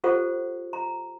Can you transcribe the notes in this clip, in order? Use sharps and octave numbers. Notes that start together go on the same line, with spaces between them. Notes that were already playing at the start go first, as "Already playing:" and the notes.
F4 G4 A4 C5 F#5
A#5